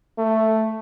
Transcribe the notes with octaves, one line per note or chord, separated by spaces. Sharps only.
A3